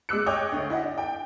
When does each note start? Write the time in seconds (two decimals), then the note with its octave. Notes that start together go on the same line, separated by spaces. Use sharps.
0.09 G#3 D6 E6 F#6 C#7
0.26 C#5 D#5 G5 D6 D#6 G6
0.52 D2
0.70 E4 D#5 F#5
0.82 D4
0.98 G5